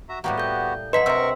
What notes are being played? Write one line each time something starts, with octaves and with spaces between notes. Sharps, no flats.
F#4 E5 A#5
A2 G3 A#3 B3 F#4 G4
A4 G6
F#3 A#3 D4 B4 D#5 C6 B6
C3 A#4 C6 C#6 E6